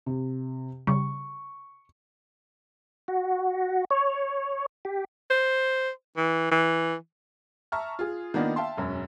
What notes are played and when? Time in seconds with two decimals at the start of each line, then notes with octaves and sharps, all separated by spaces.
0.06 C3
0.87 C#3 G3 C#6
3.08 F#4
3.91 C#5
4.85 G4
5.31 C5
6.17 E3
6.51 E3
7.72 E5 A5 A#5 C#6 F6
7.99 F4 G#4
8.34 D#3 A#3 B3 D4 D#4 F4
8.56 E5 F5 G5 A5 C6
8.77 E1 F#2 F#3 C#4